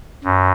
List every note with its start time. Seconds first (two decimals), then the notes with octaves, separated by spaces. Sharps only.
0.24 F#2